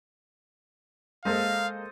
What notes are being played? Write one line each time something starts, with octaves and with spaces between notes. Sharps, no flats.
G#3 A#3 A4 C5 D#5 F5